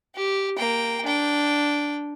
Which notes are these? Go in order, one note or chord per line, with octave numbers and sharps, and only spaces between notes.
G4
A#3 G5
D4 G5